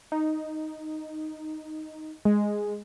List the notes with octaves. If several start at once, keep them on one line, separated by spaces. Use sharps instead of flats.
D#4
G#3